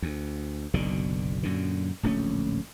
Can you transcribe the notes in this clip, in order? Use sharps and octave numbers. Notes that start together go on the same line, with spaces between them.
D2
F#1 B1 B2 D3
F#2 A#2 D3
D1 A#1 A3 C#4